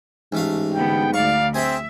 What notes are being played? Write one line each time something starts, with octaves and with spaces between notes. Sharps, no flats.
A1 G#2 A3 F5
D3 B3 G5
D2 D5 F5 C#6
C4 G#4 C5 E5 G5